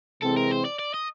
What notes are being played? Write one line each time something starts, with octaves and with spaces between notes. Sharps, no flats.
C3 E3 G#3 C4 A4
A#4
C5
D5
D5
D#5